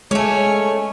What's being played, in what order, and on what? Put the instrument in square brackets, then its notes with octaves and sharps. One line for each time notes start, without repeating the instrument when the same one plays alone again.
[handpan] G#3 [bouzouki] A3 C#4 [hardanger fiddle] C#5 G#5